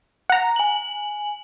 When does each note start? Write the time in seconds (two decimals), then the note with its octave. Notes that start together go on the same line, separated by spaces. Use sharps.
0.30 F#5 A#5
0.56 G#5 F#7